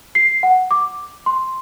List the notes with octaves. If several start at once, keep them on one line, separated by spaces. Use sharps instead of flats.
C7
F#5
D6
C6